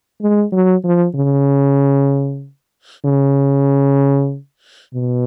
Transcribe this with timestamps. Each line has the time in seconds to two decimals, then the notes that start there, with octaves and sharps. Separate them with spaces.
0.22 G#3
0.53 F#3
0.85 F3
1.16 C#3
3.05 C#3
4.95 B2